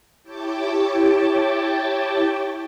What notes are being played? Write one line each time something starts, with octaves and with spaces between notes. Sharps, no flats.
E4 G4 C#5 G5 A5 D6